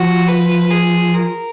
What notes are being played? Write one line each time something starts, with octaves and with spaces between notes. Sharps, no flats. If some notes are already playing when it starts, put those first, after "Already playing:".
Already playing: F3 F#4
B4
G#4
A#4